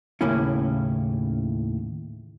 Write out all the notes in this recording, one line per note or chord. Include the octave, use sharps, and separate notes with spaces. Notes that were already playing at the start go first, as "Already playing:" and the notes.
D#2 A2 C#3 A#3 C#4 E4